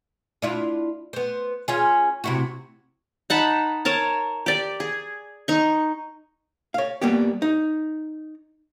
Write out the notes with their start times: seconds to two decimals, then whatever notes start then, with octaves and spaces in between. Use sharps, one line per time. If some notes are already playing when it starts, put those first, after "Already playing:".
0.42 D4 E4 F4
1.13 B3 C5
1.68 C#4 F4 G#4
2.24 C3 E4 F#4
3.30 D#4 F#5 A5 B5
3.85 A#4 C#5 A5
4.46 G4 D5
4.80 G#4
5.48 D#4 C#6
6.74 C#5 F5
7.02 G3 A#3 B3 G4
7.42 D#4